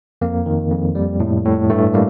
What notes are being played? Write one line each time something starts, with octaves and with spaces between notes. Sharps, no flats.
F2 A#3
D#3
F2
G3
A2
A2
G2 A3
G3 A#3